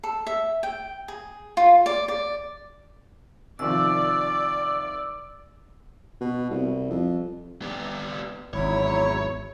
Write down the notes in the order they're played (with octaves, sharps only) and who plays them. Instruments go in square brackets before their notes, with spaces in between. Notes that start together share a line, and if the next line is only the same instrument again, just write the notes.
[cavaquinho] A4
E5
G5
G#4
F4
D5
D5
[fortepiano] C2 D#3 F3 [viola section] D5 [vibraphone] E6
[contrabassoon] B2
C2
F2
[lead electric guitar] B3 D4
[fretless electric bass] G#1 [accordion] E2 F#3 E4 [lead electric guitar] C#5